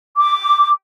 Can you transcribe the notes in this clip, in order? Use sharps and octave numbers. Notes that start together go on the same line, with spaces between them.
D6